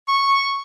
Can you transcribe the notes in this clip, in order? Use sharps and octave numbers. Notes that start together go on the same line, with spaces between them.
C#6